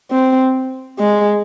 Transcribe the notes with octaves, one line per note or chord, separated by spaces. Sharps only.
C4
G#3